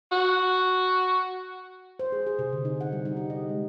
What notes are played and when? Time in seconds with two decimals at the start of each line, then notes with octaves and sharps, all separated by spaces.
0.12 F#4
1.99 C5
2.12 G#4
2.26 G#4
2.39 C3
2.53 D3
2.65 D#4
2.81 F#5
2.93 G3
3.05 D#4
3.17 G4
3.30 D#5
3.50 G#3